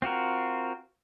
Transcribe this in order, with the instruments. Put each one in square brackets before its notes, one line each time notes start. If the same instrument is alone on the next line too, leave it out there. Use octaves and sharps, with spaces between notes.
[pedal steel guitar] C4 F4 F#4 A#4